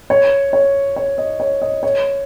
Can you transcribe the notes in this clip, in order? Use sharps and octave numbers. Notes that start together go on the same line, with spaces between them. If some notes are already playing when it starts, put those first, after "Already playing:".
C#5
C#5
C#5
D#5
C#5
D#5
C#5